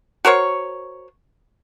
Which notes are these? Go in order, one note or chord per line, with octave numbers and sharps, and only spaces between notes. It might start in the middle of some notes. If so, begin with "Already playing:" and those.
F#4 A#4 C5 C#5